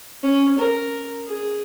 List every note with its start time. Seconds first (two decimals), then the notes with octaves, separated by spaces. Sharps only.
0.23 C#4
0.58 A#4
1.26 G#4